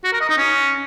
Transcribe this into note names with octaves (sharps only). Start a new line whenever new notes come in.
F#4
A#4
D#5
D#4
C#4